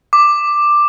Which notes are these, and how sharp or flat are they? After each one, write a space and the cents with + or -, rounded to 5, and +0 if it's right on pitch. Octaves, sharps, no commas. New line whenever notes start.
D6 +10